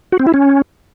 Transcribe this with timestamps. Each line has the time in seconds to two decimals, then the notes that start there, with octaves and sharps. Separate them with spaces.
0.12 F#4
0.20 C4
0.27 E4
0.34 C#4